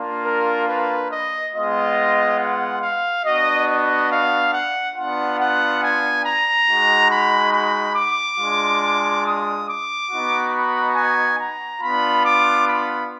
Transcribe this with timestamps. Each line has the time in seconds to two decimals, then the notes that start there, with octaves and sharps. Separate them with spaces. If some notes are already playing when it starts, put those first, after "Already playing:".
Already playing: A#3 D4 F4
0.24 A#4
0.67 B4
1.10 D#5
1.53 G#3 B3 F4 D#5
2.39 F#5
2.81 F5
3.25 B3 D4 F#4 D#5
3.67 D#5
4.11 F5
4.52 F#5
4.95 B3 D4 F4 F#5
5.38 F#5
5.82 G#5
6.24 A#5
6.67 G#3 D#4 F#4
7.10 B5
7.53 B5
7.95 D6
8.39 G#3 D4 F4
9.25 D#6
9.67 D6
10.11 B3 D#4 F#4
10.52 B5
10.96 G#5
11.38 A#5
11.82 B3 D4 F4 B5
12.24 D6
12.67 B5